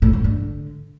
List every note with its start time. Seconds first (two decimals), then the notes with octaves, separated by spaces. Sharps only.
0.02 A2
0.13 G#2
0.24 D3